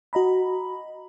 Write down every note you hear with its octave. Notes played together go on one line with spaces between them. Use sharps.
F#4 D#5 A#5 B5